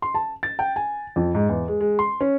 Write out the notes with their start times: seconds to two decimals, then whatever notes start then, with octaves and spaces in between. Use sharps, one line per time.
0.02 C6
0.14 A5
0.43 A6
0.59 G5
0.76 G#5
1.16 F2
1.35 G#2
1.49 E2
1.68 G#3
1.81 G#3
1.99 C6
2.21 C#4